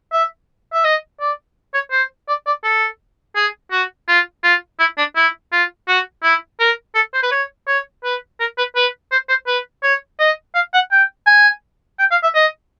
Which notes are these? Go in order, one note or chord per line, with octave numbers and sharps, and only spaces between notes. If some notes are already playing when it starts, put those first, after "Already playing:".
E5
E5
D#5
D5
C#5
C5
D5
D5
A4
G#4
F#4
F4
F4
E4
D4
E4
F4
F#4
E4
A#4
A4
C5
B4
C#5
C#5
B4
A#4
B4
B4
C5
C5
B4
C#5
D#5
F5
F#5
G5
G#5
G5
F5
E5
D#5